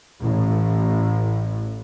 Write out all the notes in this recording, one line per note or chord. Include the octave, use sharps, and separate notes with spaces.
A1 A2